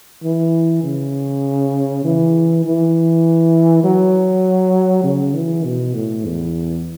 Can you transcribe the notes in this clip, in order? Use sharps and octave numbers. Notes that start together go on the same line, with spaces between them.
E3
C#3
E3
E3
F#3
C#3
E3
B2
A2
E2